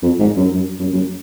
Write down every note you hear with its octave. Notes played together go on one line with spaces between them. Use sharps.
F2
G#2
F#2
F#2
F#2
F#2